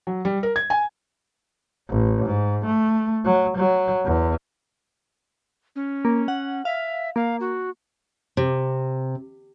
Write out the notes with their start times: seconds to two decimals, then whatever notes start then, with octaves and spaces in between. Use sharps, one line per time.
0.07 F#3
0.25 G3
0.43 A#4
0.56 G#6
0.70 G#5
1.89 A1
2.25 G#2
2.66 A3
3.25 F#3
3.57 F#3
4.05 E2
5.76 C#4
6.05 A#3
6.28 F#5
6.65 E5 F5
7.16 A#3 F5
7.40 F#4
8.37 C3